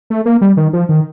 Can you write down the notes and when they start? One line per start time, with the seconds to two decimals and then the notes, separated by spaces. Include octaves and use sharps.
0.10 A3
0.26 A#3
0.41 G3
0.57 D#3
0.73 F3
0.89 D#3